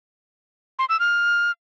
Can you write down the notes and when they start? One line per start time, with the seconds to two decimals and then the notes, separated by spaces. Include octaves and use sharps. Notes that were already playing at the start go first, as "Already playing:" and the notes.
0.79 C6
0.89 E6
1.00 F6